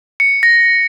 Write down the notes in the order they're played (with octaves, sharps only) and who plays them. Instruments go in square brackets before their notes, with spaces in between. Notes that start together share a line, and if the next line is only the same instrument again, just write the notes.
[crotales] C#7
A#6